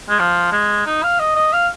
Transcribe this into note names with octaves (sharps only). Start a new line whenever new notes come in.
G#3
F3
G#3
D#4
F5
D#5
D#5
F5